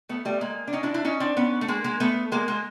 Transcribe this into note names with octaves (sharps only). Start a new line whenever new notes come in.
A3 B3
G3 A3
G#3 A#3
D4
C#4 D#4
D4 E4
D4 E4
C#4 D#4
C4 D4
B3 C#4
A3
G#3 A#3
G#3 A#3
A3 B3
G#3 A#3
G#3 A#3